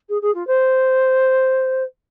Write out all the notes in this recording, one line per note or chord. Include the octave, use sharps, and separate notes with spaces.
G#4
G#4
F4
C5